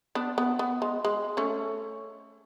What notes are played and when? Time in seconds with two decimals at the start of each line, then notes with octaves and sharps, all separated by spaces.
0.15 B3 D4
0.38 B3
0.59 B3
0.82 G#3
1.05 G#3
1.37 A3 C#4